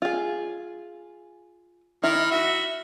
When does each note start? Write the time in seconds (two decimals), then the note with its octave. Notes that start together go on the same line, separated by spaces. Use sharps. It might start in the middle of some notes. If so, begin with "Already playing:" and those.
0.02 F4 G#4
2.03 D#3 E4 F6
2.31 F#4 E5